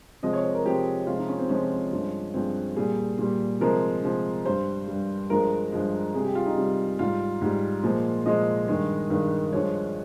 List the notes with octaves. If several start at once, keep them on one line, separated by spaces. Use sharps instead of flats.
C3 F3 G#3 D#5
C#5
C5
A#4
C3 F3 G#3 G4
C3 F3 G#3 F4
D#4
C#4
C4
C3 F3 G#3 C#4
G2 F3 G#3
G2 F3 G#3 C4
A#2 G3 G#4
A#2 G3
C3 F3 G#3 A#4
C3 F3 G#3
G2 G3 C5
G2 G3
G2 F3 G#3 A#4
G2 F3 G#3
C3 G3 G#4
G4
F4
D#4
C3 G3
G#2 G3 F4
G#2 G3
A#2 F3 G#3
A#2 F3 G#3 D#5
G2 D#3 G#3
G2 D#3 G#3
G2 F3 G#3 C#5